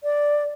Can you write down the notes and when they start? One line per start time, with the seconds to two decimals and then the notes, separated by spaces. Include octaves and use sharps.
0.03 D5